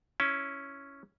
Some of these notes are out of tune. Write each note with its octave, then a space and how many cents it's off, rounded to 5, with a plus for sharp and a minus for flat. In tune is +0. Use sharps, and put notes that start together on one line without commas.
C#4 +0 E4 +0